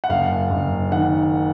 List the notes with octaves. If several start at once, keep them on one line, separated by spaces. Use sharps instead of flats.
F#5
F#1 F5
F#1
D#3 F#5